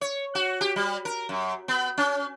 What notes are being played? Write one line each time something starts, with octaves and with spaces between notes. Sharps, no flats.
C#5
F#4
G4
G3
A#4
F#2
B3
C#4